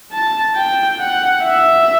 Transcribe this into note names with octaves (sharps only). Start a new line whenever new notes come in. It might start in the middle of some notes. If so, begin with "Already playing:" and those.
A5
G5
F#5
E5